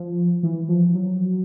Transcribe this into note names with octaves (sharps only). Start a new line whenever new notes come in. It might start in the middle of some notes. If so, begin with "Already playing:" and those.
Already playing: F3
E3
F3
F#3